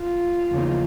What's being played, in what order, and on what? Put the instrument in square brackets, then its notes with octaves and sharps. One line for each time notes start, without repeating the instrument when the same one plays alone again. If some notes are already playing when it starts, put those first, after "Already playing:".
Already playing: [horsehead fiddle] F4
[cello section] E2 C#3 F3 A#3 D#4